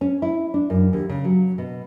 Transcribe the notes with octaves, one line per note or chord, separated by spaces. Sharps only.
C#4
E4
D4
F#2
D#2
C#3
F#3
B2